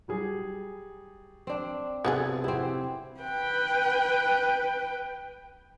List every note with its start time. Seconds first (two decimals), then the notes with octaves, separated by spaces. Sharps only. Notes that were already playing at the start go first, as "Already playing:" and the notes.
0.08 F#3 G3 G#4
1.47 C4 D4
2.05 C3 B3 F#4 G#4 A4 G#5
2.44 C4 E4 G4 F#5
3.21 B4 G5